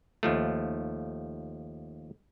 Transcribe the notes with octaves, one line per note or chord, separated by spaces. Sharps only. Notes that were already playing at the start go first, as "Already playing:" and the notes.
D#2 F3 A3